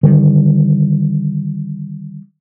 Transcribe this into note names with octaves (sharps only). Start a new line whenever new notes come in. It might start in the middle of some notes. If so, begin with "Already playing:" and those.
D3 D#3 G3